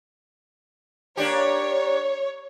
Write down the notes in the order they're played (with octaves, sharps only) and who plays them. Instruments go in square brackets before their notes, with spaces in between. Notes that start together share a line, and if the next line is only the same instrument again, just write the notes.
[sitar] A#3 D4 G4 [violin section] C#5